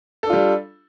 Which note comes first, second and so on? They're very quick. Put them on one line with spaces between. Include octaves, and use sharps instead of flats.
A4 D4 F4 G3